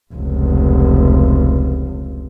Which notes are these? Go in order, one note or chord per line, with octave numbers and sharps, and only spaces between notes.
F1 C#2